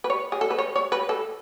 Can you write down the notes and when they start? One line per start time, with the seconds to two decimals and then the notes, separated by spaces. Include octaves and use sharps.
0.04 B4
0.10 C#5
0.32 G#4
0.41 A4
0.50 B4
0.58 C#5
0.76 C#5
0.92 B4
1.09 A4